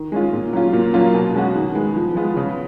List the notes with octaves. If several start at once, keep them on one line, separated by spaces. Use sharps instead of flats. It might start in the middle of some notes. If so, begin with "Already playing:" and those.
Already playing: D#3
G#3 C#4 F4
A#2
F#3 C#4 F4
A#2
F#3 A#3 C#4 F4
B2
G#3 C#4 F#4
D#3
G#3 B3
F3
G#3 B3 F4
C#3